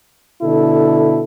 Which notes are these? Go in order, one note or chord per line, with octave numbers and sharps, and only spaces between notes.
B2 D3 E4 A4